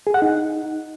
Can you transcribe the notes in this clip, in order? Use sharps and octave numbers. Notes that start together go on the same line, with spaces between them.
G#4
F#5
D#4